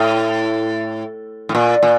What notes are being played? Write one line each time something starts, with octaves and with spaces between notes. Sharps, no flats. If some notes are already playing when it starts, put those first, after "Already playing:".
Already playing: A2
A2
A#2
A#2